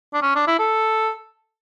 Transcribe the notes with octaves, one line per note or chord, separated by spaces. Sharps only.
D4
C#4
D4
E4
A4